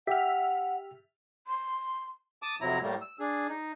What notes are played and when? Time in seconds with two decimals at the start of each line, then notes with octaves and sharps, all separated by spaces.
0.07 G4 E5 F#5 F6
1.47 C6
2.42 A5 D6 D#6
2.61 F2 C3 F#3 E4 A#5
2.83 A2 G3 A3 A#3
3.01 E6
3.20 D4 G#4
3.49 D#4